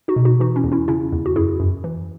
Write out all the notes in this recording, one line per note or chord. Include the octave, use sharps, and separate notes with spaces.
D#4 F#4
B2
D#4 F#4
E3 D#4 F#4
C#4 E4
E2
C#4 E4
C#3 C#4 E4
E2
F#4
F#2 E4 G#4
F#2
E3